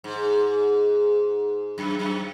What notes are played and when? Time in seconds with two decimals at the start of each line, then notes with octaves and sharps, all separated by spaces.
0.04 G#2
1.78 F#2
1.99 F#2